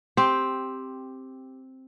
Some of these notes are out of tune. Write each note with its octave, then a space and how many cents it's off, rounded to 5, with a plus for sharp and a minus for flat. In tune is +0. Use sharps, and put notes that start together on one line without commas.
C4 +5 G4 +0